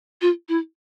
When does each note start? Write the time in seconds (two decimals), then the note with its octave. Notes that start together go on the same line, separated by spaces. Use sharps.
0.22 F4
0.49 E4